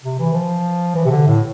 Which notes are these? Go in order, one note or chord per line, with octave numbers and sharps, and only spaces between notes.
C3
E3
F3
E3
C3
D3
A2